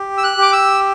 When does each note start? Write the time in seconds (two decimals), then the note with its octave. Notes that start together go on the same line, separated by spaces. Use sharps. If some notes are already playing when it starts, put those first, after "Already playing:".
Already playing: G4
0.18 E6
0.24 F#6
0.38 G4 D6
0.53 E6